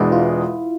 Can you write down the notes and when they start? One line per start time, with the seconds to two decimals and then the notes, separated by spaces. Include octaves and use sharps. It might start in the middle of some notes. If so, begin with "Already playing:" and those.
Already playing: E1 E2 B2 G#3 D4 E4
0.12 F4